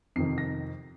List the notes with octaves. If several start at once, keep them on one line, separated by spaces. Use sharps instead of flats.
F2 C3 D#3 C7
A#6